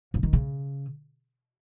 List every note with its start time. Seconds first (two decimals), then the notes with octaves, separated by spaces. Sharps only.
0.14 C#3
0.23 D#3
0.33 C#3